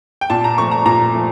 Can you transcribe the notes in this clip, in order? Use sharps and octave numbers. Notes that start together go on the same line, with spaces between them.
G5
A#2 A5
A#5
F3 A3 C#6
A#5
A#2 A#5
F3 A3